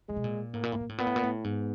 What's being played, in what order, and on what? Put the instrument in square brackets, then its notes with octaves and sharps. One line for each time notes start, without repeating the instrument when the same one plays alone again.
[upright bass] C3 [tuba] G#3
[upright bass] B2
A#2
[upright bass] A2 [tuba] A#3
[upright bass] A#2
A2
A#2
A2
[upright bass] A#2 [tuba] B3
[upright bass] A2
A#2
A2
[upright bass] G#2 [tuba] B3